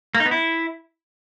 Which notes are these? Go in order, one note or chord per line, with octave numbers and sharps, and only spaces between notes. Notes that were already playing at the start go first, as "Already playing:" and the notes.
A#3
D#4
B3
E4